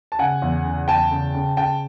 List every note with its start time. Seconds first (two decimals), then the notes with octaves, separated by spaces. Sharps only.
0.12 A5
0.19 C#3 F#5 G#5
0.42 E2
0.65 C#3
0.88 E2 G5 A5
1.11 C#3
1.34 C#3
1.57 C#3 G5 A5